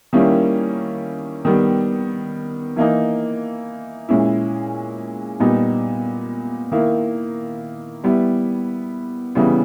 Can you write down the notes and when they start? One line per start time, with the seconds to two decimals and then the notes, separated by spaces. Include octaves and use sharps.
0.13 D#3 G3 A#3 C#4 E4
1.45 D#3 G3 B3
2.76 E3 A#3 D#4
4.09 A#2 G#3 C#4 E4
5.40 A#2 G3 B3 D#4
6.72 D#3 A#3 E4
8.04 G3 B3 E4
9.35 C#3 E3 G3 B3 E4